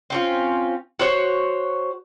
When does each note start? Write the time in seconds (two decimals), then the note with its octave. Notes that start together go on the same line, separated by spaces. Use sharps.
0.10 C4 C#4 F4
0.99 F#4 C5 C#5